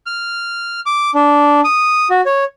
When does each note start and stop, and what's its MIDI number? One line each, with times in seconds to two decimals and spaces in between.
0.06 0.80 89
0.86 1.11 86
1.15 1.61 62
1.64 2.08 87
2.10 2.21 66
2.26 2.44 73